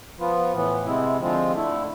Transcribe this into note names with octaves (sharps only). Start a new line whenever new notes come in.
F3 B3 F4
A2 E3 B3
C3 G#3 C4 E4
D3 F3 G#3 C4 F4
D3 A3 E4